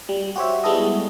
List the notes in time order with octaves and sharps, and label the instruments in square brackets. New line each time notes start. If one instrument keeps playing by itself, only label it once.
[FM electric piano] G3
F#4 G4 C5 C#5 E5
G3 G#3 B3 E4 A4 D#5